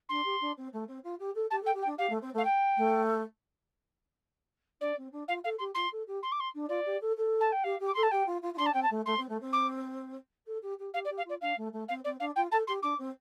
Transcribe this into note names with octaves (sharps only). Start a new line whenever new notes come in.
D4 C6
G4
D4
C4
A3
C4
F4
G4
A4
G4 A5
A4
G5
G4
G5
D4
G4 F5
A3
C4
A3
F5
G5
A3
D4 D5
C4
D4
F4 F5
A4 F5
G4 C6
F4 C6
A4
G4
C6
D6
C6
D4
F4 D5
G4
A4
A4
A5
G5
G4 F5
G4
D6
A4 C6
A5
G4 G5
F4
F4
F4
D4 C6
A5
C4 G5
A5
A3
A3 C6
C4
A3
C4
D6
A4
G4
G4
G4 F5
D5
G4
F5
F4 D5
D4 F5
A3
A3
C4 F5
C4 D5
D4 F5
F4 G5
A4 A5
G4 C6
D4 D6
C4